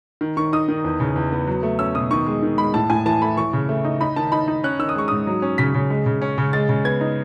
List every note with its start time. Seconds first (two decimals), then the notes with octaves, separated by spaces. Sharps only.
0.21 D#3
0.37 D#3 C#6
0.53 D#4 D#6
0.69 D#3
0.84 E2
1.00 C#3
1.16 E2
1.32 B3
1.47 F#3
1.63 A3
1.79 C#4 E6
1.95 B2 D#6
2.11 D#3 C#6
2.27 G#3
2.43 D#3
2.58 G#3 B5
2.74 A2 A5
2.90 A2 G#5
3.06 E3 A5
3.22 A3 B5
3.37 E3 C#6
3.53 C#3
3.69 A3
3.84 D#4
4.00 D#4 B5
4.16 D#3 A5
4.32 D#4 B5
4.48 D#4
4.64 C#4 F#6
4.79 D#3 E6
4.89 D#6
4.95 G#3 C#6
5.08 G#2 D#6
5.27 F#3
5.42 C#4
5.58 C#3 B6
5.74 C#3
5.90 G#3
6.06 C#3
6.22 C#4
6.38 C#3
6.53 G#3 A6
6.69 C#3
6.85 B3 G#6
7.01 D#4